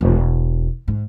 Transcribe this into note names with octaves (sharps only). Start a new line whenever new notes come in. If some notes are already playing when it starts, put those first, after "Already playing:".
E1
G#2